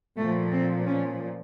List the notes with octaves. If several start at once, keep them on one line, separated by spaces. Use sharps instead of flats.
A#2 F3 A3
C4
C#4